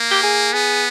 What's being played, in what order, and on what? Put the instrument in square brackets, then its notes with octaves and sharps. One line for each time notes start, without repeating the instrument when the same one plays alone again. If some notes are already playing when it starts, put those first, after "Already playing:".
Already playing: [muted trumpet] A#3
[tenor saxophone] G4
G#4
[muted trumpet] B3 [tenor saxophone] G#4